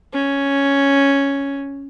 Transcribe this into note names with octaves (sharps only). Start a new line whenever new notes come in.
C#4